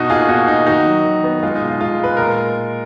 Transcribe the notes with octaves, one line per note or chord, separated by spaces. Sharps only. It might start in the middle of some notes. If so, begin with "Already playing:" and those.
Already playing: B2 D#4 F#4
A#3 F4 G#4
B2 D#4 F#4
B2 D#4
D#3 D#4 F#4
F#3
D#3
B3
G#3 F4
D#4
B2
F4
G#3 F4
G#3 B4
A#2 A#4